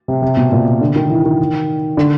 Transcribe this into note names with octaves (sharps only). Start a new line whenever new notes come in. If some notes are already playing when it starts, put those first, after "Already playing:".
C3
C3
B2
A#2
D3
D#3
E3
D#3
D3